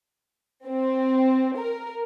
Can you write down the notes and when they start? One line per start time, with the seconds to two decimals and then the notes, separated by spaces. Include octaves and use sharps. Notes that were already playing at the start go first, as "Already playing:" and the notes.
0.67 C4
1.56 A#4